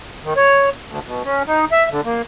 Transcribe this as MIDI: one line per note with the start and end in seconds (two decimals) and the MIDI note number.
0.24 0.34 51
0.37 0.69 73
0.86 0.99 38
1.05 1.22 47
1.25 1.43 61
1.47 1.65 63
1.72 1.89 76
1.91 2.01 50
2.05 2.22 58